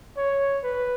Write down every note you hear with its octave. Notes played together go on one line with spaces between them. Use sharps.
C#5
B4